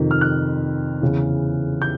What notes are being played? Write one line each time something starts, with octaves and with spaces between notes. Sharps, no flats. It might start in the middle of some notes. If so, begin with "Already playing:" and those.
Already playing: F2 C3 D#3
F6
F#6
E2 C#3 E3
G6